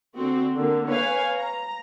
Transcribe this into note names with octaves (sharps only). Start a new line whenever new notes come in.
D3 C4 F#4
D3 A#3
B4 C#5 F5 G#5
A#5